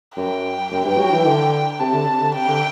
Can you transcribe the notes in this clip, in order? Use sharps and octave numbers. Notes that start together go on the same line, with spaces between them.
F#2 G5
F#2
G2
F#3
E3
D3
C3 A5
D3
C3
D3
C3 G5
D3